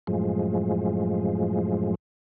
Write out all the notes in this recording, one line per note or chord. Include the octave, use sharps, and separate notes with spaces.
F#2 A2 F3 G#3